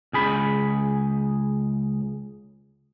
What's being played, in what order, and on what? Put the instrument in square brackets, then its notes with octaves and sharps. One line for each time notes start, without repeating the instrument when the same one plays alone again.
[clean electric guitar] C#2 G#4 B5